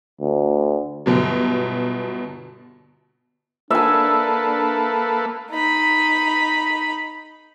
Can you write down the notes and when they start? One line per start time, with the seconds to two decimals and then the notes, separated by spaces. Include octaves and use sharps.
0.21 D2
1.06 G1 B2 F#3
3.71 A#3 D4 A4 B4 E5 G#5
5.52 D#4 B5